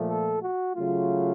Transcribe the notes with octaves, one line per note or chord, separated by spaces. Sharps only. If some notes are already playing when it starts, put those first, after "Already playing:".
Already playing: A#2 F3 A3
A4
F#4
C#3 F#3 A3 F4